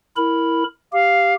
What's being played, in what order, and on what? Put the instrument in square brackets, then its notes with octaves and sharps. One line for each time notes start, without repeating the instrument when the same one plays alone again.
[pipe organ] E4 A#4 B5
[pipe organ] G4 [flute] F5